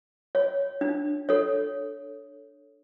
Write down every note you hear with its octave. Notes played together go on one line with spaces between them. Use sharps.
C#5
D4
A4 C#5